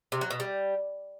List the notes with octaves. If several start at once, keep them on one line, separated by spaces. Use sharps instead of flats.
C3
F#3
B2
G3